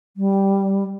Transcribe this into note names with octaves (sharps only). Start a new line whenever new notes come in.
G3